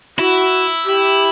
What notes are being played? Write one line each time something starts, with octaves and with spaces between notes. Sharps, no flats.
E4 F#4
G4